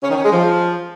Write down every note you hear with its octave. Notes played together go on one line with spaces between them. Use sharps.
C#4
D#3
C#4
G#3
F3